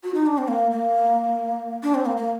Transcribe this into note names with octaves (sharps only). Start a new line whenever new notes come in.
F#4
D#4
D4
C4
A#3
A#3
D4
C4
A#3
A#3